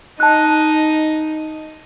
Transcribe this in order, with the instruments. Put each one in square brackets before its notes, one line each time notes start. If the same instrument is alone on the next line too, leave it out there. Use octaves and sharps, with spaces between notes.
[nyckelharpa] D#4 [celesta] A5 F#6